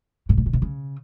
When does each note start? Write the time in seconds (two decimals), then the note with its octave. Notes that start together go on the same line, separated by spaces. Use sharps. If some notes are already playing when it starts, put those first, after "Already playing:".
0.29 A2
0.37 A#2
0.46 B2
0.53 C3
0.62 C#3